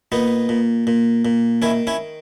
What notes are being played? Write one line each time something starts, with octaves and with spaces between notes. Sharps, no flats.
A#2 B3 D#4
A#2
A#2
A#2
D#3 C#4 E4
C#4 E4